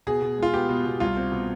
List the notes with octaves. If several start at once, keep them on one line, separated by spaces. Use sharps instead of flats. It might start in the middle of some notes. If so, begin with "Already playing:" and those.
B2 G#4
B2
G#3 F4
B3 G4
B2
B2
C2 F4
C4
B2